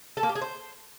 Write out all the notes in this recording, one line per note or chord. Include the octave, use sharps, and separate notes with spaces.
A4
A#3
G4
G#4
C5